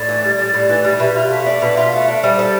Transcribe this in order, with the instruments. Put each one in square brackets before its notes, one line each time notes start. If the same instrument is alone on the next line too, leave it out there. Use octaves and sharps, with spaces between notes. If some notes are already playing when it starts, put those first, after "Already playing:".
Already playing: [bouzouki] A2 [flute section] D5
[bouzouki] E3
G3
A2
A2
E3
G3
[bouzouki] B2 [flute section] E5
[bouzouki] F4
[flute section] E5
[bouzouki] A3
D4
B2
F4
A3
D4
[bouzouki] G3 [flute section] C5
[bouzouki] A4 [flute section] D5